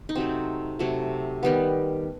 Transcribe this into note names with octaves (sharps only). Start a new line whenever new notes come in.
D#4
C3 F#3 A3 C4
C3 F#3 A3
D#3 G3 B3